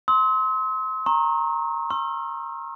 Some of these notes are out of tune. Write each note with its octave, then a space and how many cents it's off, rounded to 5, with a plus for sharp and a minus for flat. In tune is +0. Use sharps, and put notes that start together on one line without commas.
C6 +0 E6 -45
A#5 +0 C#6 -45
A#5 +0 C#6 -45 E6 +40